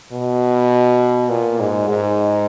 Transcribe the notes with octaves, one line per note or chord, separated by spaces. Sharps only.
B2
A#2
G#2
G#2